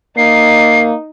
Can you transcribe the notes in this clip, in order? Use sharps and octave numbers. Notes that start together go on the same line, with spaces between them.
A#3 D#4 C7